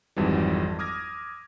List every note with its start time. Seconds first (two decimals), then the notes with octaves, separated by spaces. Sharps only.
0.16 G#1 F2 G#2 E3 F#3 G3
0.79 D6 D#6 F6 G#6 A#6